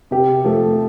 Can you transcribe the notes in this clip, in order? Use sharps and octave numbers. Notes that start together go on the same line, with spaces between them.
C3 G4
F3 A3